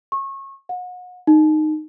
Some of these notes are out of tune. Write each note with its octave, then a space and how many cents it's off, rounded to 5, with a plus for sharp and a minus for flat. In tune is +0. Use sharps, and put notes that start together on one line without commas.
C#6 -25
F#5 -35
D#4 -15